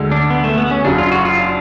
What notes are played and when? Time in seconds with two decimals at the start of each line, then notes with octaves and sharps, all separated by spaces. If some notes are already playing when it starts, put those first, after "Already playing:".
Already playing: D2 D3 G#3
0.11 D4
0.30 B3
0.44 A3
0.58 B3
0.71 C#4
0.84 F#1 F#2 C#3 D4
0.98 F4
1.12 F#4
1.25 F4
1.39 D4